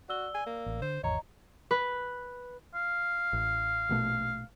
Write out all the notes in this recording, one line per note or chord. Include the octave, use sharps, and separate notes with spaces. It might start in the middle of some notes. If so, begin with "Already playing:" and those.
F#4 D5 E6 G7
G#5
A#3
A1
D3 C5
G#1 E2 C#5 D#5 A#5
B4
F5
A1
A#1 B2 A3